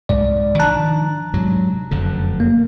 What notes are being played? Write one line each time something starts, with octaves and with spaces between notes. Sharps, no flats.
C2 G#2 D5
D#3 F3 D4 A5 A#5 F#6
G#2 C3 F#3
F1 F#2 D3
A#3